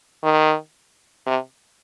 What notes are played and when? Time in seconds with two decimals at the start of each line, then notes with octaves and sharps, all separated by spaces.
0.24 D#3
1.27 C3